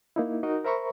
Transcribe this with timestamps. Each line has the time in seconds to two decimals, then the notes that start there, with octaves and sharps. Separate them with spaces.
0.16 A#3 D#4 E4
0.43 D#4 F#4 A#4 D#5
0.64 A#4 C5 E5 A#5 B5 C#6